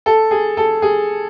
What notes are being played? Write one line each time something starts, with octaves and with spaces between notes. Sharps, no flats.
A4
G#4
A4
G#4